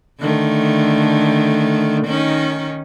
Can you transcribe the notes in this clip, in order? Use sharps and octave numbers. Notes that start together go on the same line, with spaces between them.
D3 D#3 A3
D#3 C#4 D#4